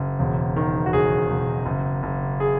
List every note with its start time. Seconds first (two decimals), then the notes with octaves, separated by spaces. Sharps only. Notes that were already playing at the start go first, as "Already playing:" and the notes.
Already playing: F#1
0.19 E1
0.56 D#3
0.86 F#4
0.93 E1 G#4
1.30 E1
1.66 F#1
2.03 F#1
2.40 G#4